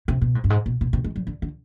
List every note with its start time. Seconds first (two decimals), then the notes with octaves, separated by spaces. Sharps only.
0.08 C3
0.21 B2
0.35 G#2
0.44 G2
0.50 G#2
0.66 B2
0.81 B2
0.93 C3
1.04 G#3
1.16 G3
1.23 C3
1.27 D3
1.42 D3